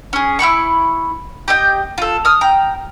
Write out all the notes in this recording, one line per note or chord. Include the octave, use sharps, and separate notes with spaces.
C#4 G#4
E4 F#4 B5 C#6
G4 D#5 G5
F4 A4
D#6 F6
G5 A#5